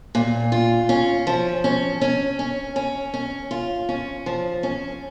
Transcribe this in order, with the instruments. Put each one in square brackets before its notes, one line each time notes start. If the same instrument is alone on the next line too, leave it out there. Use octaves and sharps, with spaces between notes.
[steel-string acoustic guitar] A#2
F4
C#4
F3
C#4
C#4
C#4
C#4
C#4
F4
C#4
F3
C#4